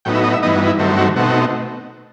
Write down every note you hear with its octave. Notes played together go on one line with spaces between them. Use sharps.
A2 F#3 B3 D#4 G5
E5
D#5
E5
G2 E3 B3 D#4 D#5
F#4
E4
G2 D#3 F#3 A3 C4
F#4
B2 A3 C4 D#4 F#4